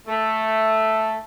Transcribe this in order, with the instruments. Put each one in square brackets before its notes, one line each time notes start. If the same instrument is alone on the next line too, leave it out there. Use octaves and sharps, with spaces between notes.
[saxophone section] A3